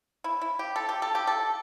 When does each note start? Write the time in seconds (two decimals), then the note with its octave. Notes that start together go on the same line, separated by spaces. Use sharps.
0.24 E4
0.41 E4
0.59 G4
0.76 A4
0.89 G4
1.02 A4
1.15 G4
1.27 A4